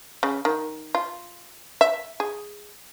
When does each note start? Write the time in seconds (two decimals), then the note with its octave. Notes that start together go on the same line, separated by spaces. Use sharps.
0.23 C#3
0.45 D#3
0.95 F4
1.81 E5
2.20 G#4